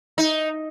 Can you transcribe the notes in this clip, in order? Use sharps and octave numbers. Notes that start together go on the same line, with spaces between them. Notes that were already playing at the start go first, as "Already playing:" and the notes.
D#4